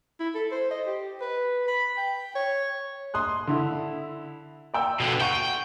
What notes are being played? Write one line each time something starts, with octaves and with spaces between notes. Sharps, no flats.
E4
A4
C5
D#5
G4
B4
B5
G5
C#5
C6 D#6 F#6
D3 E4
D5 G5 E6
B2 D3
F#5 G5 C#6 D#7